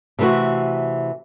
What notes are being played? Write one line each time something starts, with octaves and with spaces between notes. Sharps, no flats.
C3 E3 A3 C4 F#4